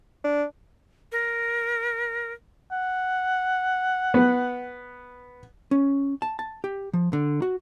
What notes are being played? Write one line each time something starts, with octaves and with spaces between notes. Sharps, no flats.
D4
A#4
F#5
B3
C#4
A5
A5
G4
F3
D3
F#4